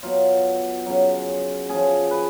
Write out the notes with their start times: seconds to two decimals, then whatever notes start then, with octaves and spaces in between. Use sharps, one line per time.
0.03 B2 F#3 F4
0.86 C#3 F#3
1.69 C#3 F3 G#4
2.11 B4